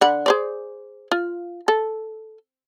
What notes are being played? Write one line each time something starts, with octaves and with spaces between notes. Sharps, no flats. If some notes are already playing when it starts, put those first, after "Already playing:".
D3 F#5 B5
G#4 C5 D5
F4
A4